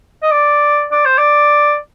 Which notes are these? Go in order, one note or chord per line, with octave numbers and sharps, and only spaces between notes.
D#5
D5
D5
C5
D5